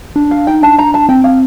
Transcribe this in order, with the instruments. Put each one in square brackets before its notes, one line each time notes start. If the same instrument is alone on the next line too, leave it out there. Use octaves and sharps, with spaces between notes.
[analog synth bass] D4
[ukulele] F5
[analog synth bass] D#4 [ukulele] G5
[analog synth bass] D4 [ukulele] A5
[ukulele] A#5
A5
[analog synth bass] C4 [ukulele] G5
[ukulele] F5